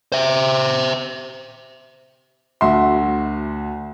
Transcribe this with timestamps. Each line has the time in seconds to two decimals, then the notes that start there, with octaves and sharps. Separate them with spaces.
0.12 C5 E5
2.61 D2 F#4 E5 C6